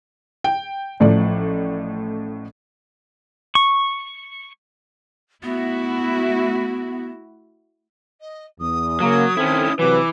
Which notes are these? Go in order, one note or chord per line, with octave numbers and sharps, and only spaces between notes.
G5
A1 A2 F3 D5
C#6
A3 B3 E4 F#4
D#5
E2 D#6
C#3 F#3 A#3
D#3 C4 C#4 E4 A4
C3 E3 F#3 B4 D6